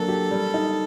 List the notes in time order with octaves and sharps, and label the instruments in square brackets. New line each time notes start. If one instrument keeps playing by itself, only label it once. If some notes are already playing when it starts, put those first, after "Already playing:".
Already playing: [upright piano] F#3 A#3 D4 [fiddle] A4
[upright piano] G4
G3
D#4